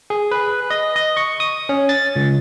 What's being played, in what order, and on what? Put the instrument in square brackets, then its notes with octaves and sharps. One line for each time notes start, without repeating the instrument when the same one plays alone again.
[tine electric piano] G#4
B4
D#5
D#5
C#6
D#6
C#4
A6
C#2